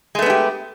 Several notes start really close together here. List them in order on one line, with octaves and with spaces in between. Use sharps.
G#3 A3 B3 D4 G4